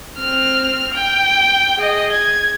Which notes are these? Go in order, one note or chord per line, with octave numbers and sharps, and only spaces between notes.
C4 F6
G5
G#4 D#5
G#6